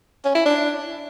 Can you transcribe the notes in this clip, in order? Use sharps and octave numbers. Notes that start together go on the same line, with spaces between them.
C#4
E4
D4